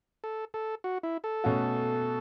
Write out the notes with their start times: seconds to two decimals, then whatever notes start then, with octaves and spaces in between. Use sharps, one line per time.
0.24 A4
0.54 A4
0.84 F#4
1.03 E4
1.24 A4
1.44 B2 A3 C#4 F#4